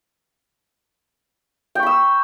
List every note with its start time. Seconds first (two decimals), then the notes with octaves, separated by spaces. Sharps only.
1.75 G5
1.79 C#6
1.83 B5
1.86 E6